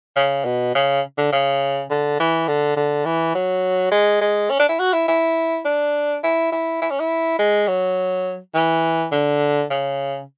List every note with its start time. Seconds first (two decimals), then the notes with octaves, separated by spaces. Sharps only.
0.16 C#3
0.45 B2
0.75 C#3
1.18 D3
1.32 C#3
1.90 D3
2.20 E3
2.48 D3
2.77 D3
3.05 E3
3.35 F#3
3.92 G#3
4.21 G#3
4.50 C#4
4.60 D4
4.69 E4
4.79 F#4
4.93 E4
5.08 E4
5.65 D4
6.23 E4
6.52 E4
6.82 E4
6.91 C#4
7.00 E4
7.39 G#3
7.68 F#3
8.55 E3
9.12 D3
9.70 C#3